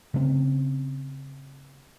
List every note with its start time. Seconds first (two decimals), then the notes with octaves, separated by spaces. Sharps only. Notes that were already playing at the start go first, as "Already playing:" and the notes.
0.14 C#3 A3 A#3 C4